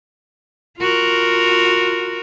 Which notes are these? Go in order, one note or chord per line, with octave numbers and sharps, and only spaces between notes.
F4 F#4 A#4